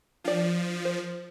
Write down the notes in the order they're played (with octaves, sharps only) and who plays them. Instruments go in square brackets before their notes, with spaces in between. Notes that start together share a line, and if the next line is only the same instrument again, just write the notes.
[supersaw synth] F3 [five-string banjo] D4 D5
[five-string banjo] C5